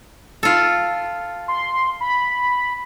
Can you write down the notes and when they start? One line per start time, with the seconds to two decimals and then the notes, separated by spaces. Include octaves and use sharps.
0.43 F4 A4
1.48 C6
2.00 B5